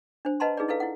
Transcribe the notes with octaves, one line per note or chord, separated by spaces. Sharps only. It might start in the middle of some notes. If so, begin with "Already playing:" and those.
D4 C5
B4 D#5 F#5 A5 A#5 C6
D#4 G#4 B4 D5
E4 A4 B4 F5
E4 F#5